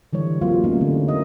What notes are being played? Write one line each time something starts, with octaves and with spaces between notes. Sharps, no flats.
D3 E3 G3 C#5
F#3 G3 A#3 C4 F4
G3 A3 B3 C#4 D#4 F4
D3 E4
C#4 A#4 D#5